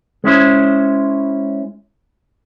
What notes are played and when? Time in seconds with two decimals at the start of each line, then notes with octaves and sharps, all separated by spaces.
0.24 G#3 C#4 E4 C5